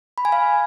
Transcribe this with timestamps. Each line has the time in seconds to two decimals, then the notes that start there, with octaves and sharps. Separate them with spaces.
0.18 B5
0.25 G#5
0.32 F5